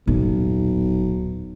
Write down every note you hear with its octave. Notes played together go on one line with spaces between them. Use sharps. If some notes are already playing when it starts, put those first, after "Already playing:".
D#1 B1